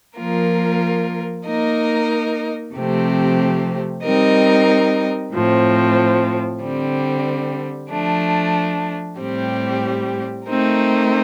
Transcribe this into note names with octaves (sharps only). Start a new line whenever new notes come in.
F3 A#3 F4 A#4
A#3 D#4 A#4 D#5
C3 F3 A3 C4 G4
G3 C4 D#4 A#4 D#5
A2 F3 C4
D3 G3 C4
F3 A3 D4
A2 G3 C4 G4
A3 C4 D#4 A#4